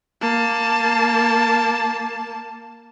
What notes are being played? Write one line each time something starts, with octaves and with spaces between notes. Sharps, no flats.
A#3 A5